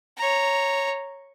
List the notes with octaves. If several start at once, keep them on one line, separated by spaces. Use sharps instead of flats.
C#5 A#5